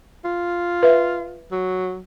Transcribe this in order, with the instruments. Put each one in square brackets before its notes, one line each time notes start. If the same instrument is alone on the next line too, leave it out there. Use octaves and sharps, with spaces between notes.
[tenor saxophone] F4
[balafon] B4 E5
[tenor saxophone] F#3